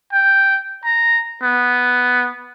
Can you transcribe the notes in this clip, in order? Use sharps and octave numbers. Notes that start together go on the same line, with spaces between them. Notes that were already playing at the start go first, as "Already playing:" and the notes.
G5
A#5
B3